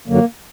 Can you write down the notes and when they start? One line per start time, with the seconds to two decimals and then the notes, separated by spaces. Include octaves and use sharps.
0.08 F#2 D3 F#3 A#3